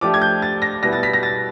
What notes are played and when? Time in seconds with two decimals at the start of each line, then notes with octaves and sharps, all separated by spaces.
0.01 F3 A3 D4 G4 D6
0.14 G#6
0.22 G6
0.42 A6
0.62 A#6
0.82 B2 G3 B3 E4 A#6
0.93 A6
1.03 B6
1.13 A#6
1.23 A6